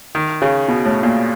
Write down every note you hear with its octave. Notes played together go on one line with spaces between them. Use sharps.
D#3
C#3
B2
A2
A#2